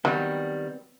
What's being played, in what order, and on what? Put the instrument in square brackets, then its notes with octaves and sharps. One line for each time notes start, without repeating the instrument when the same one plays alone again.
[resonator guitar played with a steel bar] D#3 G3 [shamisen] F#3 [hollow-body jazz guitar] B3 C4 F#4